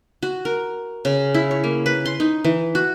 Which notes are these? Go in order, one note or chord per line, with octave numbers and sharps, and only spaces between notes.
F#4
A#4
C#3
E4
C#5
A#3
B4
C6
D#4
E3
F#4